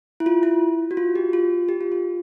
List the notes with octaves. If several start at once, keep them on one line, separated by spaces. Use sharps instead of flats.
E4
F4
E4
F#4
F4
G4
F4
G4
F4
F4